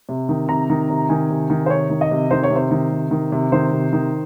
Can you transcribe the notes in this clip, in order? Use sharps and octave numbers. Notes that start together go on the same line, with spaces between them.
C3
D#3
C3 A#5
D#3
C3
D#3 G#5
C3
D#3
C5
C3 C#5
D#3
D#5
C3
D#3 C5
C#5
C3 C5
D#3
C3
D#3
C3
D#3 C5
C3
D#3